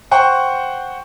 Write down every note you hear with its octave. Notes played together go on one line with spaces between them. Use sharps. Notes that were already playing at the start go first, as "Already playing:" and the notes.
C5 F#5 G5 C#6